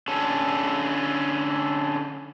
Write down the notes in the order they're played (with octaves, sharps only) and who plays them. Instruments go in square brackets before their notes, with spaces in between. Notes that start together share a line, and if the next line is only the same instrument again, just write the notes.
[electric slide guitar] D3 C#4 A4